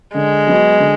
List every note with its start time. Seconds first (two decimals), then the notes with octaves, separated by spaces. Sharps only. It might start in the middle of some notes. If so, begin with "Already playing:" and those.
0.15 D3 G#3
0.47 F#3 B3 D#4 F#4
0.79 D3